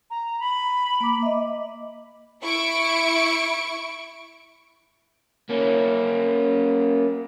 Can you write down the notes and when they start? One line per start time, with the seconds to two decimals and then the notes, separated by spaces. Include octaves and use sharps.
0.10 A#5
0.39 B5
1.00 A#3 D6
1.23 D#5 E5
2.42 E4 C#6 D7
5.49 A#3 C#4